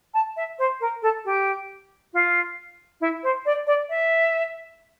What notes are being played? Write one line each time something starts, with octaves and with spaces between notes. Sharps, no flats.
A5
E5
C5
A#4
A4
G4
F4
E4
C5
D5
D5
E5